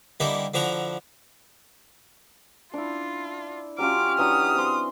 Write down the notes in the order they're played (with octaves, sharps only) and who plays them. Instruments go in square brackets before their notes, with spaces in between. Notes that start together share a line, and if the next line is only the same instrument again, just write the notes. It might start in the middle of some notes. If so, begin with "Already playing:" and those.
[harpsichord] D3 G3 A#3 D#4 E4 A#4
D3 F3 E4 F#4 A#5
[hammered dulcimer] D4 E4 [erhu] F4
[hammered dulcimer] F#3 C#4 F4 [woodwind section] G4 F6 [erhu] D6
[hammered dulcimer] E3 F#3 D4 [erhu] D#6
[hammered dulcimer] C4 C6